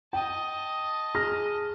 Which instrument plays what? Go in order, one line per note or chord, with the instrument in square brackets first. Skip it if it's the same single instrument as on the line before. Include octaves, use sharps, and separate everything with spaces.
[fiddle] D#5 A5 [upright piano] G5
[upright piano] G#4 F6 A#6